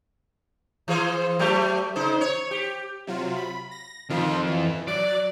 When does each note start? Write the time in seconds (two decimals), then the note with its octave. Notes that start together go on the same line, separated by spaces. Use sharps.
0.88 E3 G#4 C5
1.39 F#3 A3 G4
1.96 C#3 D#4 C5
2.21 C#5
2.51 G4
3.07 C3 F#3 F4
3.37 B5
3.71 A#6
4.10 F2 D#3 F4
4.47 E3
4.87 F#3 D5 D6 F#6